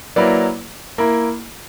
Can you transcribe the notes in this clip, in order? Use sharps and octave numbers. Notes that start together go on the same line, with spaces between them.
F#3 A#3 E4 B4 D5
A#3 E4 A#4